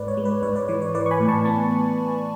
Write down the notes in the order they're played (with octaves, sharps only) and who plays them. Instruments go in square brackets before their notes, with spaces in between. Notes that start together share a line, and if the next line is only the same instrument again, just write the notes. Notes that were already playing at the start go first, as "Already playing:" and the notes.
Already playing: [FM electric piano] G#2 B4 D5
C#5
G#3
B4
G#2 C#5
B4 D5
E3 C#5
C#5
E3 B4 D5
C#6
G#5 B5
A2
A5 C#6
B3 A5 C#6